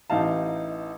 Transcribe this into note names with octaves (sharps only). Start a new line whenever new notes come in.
A1 E3 D#4 F5 A5